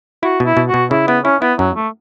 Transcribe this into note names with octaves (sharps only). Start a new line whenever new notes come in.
E4 F#4
B2
E4
B2
B2 F#4
C#3 E4
B3 E4
C#4 E4
B3 E4
F#2 F#3
A3